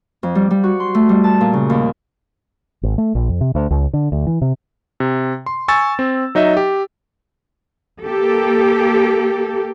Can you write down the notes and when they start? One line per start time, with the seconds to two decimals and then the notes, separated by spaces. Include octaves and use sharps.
0.23 F2
0.35 G3
0.51 G3
0.64 F#4
0.80 C6
0.95 A3
1.09 G3
1.24 A5
1.41 A#2
1.53 C#3
1.70 D#2
2.83 G#1
2.98 A3
3.15 A#1
3.29 F2
3.41 C3
3.55 D2
3.71 C#2
3.93 D3
4.12 D2
4.27 E3
4.42 C3
5.00 C3
5.46 C6
5.68 G#5 C#6 E6 A6
5.99 C4
6.35 F#3 D#4 D#5 E5
6.57 G4
8.02 A#3 G4 A4